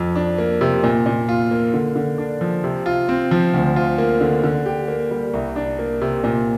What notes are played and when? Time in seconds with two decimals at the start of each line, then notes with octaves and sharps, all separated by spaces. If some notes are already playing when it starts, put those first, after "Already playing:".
Already playing: F2
0.16 D4
0.38 A#3
0.61 C3
0.84 A#2
1.06 A#2
1.29 F4
1.51 A#3
1.74 D3
1.96 D3
2.18 D4
2.41 F3
2.64 C3
2.86 F4
3.09 C4
3.31 F3
3.54 D2
3.76 F4
3.98 A#3
4.21 D3
4.44 D3
4.66 G4
4.88 A#3
5.11 G3
5.34 C2
5.56 D4
5.79 A#3
6.01 C3
6.24 A#2